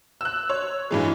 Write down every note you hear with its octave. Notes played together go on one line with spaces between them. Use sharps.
E6 F#6
C#5
G2 E3 G#3